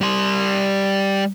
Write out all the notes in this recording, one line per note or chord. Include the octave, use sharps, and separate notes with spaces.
G3 C6